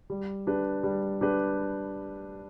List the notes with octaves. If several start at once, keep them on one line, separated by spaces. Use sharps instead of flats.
G3
D4 G4 B4
G3
D4 G4 B4